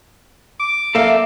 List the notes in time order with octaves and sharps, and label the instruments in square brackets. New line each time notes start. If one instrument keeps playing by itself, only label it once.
[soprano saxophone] D6
[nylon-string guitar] A#3 D5 E5 [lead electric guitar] A4 F5